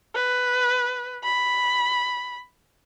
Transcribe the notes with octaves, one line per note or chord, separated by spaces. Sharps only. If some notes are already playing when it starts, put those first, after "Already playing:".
B4
B5